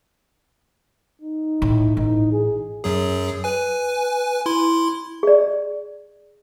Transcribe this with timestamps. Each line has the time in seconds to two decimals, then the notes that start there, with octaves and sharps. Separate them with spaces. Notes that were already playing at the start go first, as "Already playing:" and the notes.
1.21 D#4
1.62 A2
1.97 A1 D#4
2.32 G#4
2.84 F#2 F#3 G#4
3.44 B4 G#5
4.46 E4 C6
5.23 G#4 D5